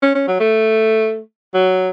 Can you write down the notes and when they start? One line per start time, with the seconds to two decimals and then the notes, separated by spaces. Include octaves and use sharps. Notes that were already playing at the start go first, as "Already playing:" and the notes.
0.02 C#4
0.15 C#4
0.28 F#3
0.40 A3
1.54 F#3